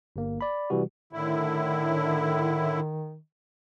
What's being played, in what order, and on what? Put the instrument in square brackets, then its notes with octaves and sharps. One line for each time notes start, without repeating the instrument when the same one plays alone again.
[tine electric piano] G1 A#3
D5 B5
C3 E3 G3 F#4
[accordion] A2 D3 E4 [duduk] D#3